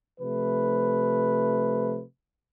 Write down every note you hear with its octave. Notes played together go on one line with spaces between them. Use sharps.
C3 F3 A3 B4